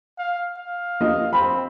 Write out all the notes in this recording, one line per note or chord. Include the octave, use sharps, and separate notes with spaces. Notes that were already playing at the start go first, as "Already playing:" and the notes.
F5
F5
A#3 F4 D#5
C4 B5